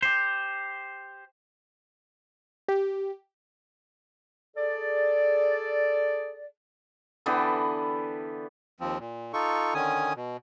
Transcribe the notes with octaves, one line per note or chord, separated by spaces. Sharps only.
G4 C5
G4
G#4 A4 D5
D3 E3 B3 G4
D#2 F3 C4
A#2
D#4 F4 A4 C#6
D3 D#3 C#4 G#5 D#6
B2